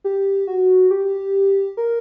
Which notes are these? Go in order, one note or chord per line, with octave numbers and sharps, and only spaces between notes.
G4
F#4
G4
A#4